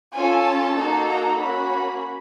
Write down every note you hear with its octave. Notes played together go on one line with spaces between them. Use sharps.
C#4 F4 A4 G#5
A5
A#3 D#4 F#4 A4
A#5
A#3 C#4 F#4 B5